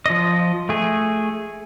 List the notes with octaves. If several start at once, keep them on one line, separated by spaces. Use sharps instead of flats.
F3 D#5
A3 G#4